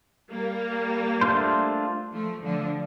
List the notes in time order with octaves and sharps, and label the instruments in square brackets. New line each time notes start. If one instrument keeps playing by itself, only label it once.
[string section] G3 A#3
[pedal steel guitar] A3 D4 F4 C5
[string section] F3 A3
D3 F3